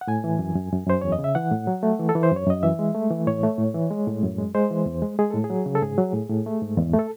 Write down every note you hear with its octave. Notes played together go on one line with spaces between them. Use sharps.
F#5
A2 G#5
E3
F#2
F#2
F#2
F#2 C5
E2 C#5
D#5
C#3
E5
E3 F#5
A2
F#3
A3
E3
A4
E3
C5
F#2 C#5
F#2 D#5
E3 E5
G#3
A3
E3
A2 C#5
A3
A2
E3
G#3
A2
F#2
G#3
G#3 C5
E3
E2
G#3
G#3 G#4
A2 A4
G#4
F#3
C#3
A4
G#2 G#4
F#3
A2
A2
A3
G#2
E2
A3
A4